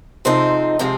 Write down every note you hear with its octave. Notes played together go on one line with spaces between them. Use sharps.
C3 F3 G#3 C4 D#4 C5
C3 F3 G#3 C4 D#4